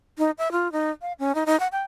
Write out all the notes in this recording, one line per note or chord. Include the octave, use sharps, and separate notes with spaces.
D#4
E5
F4
D#4
F5
C#4
D#4
D#4
F#5
G5